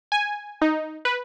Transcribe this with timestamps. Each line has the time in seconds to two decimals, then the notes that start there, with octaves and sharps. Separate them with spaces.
0.12 G#5
0.62 D#4
1.05 B4